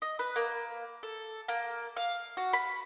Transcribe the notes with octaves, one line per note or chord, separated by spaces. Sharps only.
D#5
B4
A#3
A4
A#3
F5
F#4
B5